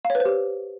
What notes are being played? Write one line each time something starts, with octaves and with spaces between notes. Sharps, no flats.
F5
C#5
B4
C5
G4